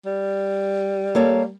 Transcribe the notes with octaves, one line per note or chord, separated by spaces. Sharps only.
G3
A#3 A4 C#5